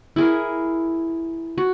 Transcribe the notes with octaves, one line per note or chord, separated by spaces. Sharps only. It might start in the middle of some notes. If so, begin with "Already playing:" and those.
E4 G#4 A#4
F#4